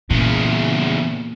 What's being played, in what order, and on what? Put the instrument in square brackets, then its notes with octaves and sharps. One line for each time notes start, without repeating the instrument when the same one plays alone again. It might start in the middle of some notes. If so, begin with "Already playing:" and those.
[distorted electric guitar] E2 C#3 [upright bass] A#2